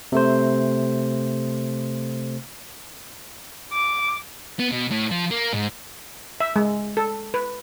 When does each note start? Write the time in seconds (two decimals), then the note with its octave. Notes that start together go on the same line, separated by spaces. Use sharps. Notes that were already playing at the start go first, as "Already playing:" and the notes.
0.12 C3 A3 C5
3.73 D6
4.60 B3
4.72 B2
4.91 A2
5.11 F3
5.31 A#3
5.53 G#2
6.40 E5
6.56 G#3
6.97 A4
7.34 B4